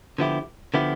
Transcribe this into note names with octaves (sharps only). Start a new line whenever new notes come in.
D3 F3 B3 E4 G4
D3 F3 B3 E4 G4